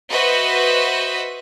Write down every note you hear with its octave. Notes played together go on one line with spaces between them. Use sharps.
F#4 B4 C5 D#5 E5